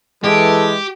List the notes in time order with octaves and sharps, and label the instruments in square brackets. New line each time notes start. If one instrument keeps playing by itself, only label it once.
[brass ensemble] E3 [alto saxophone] G#3 [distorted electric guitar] G4 [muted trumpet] A4